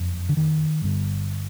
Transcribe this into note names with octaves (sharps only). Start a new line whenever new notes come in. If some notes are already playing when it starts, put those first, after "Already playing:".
Already playing: F#1 F2
D3
D#3
G1 G2 D3